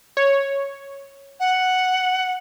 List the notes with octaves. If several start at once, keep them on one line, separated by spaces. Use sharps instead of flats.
C#5
F#5